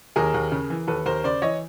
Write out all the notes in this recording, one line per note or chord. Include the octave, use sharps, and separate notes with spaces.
D#2 G#4 A#4
D#2
C#3
E3
D#2 A4 B4
D#2 A#4 C5
C#3 C5 D5
E3 C#5 D#5